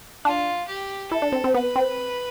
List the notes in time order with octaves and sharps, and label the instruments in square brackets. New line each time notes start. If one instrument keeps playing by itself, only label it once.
[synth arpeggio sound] D4 [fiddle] F4
[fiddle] G4
[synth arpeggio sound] E4 [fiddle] A4
[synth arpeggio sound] D4
C4
C4
[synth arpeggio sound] B3 [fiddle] B4
[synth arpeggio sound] C4